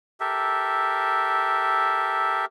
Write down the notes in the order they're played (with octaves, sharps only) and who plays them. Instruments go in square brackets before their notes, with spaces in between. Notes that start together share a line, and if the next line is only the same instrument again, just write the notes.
[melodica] G4 A4 A#4 E5